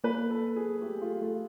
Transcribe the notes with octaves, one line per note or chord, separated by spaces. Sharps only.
A#3 B4
A4
G#4
A3 G4
A3 F4
A3 F4